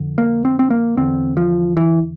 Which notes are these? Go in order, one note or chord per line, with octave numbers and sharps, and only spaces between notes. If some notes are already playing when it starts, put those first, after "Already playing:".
Already playing: F2 D3
A#3
C4
C4
A#3
E2 D3 C4
F3
E3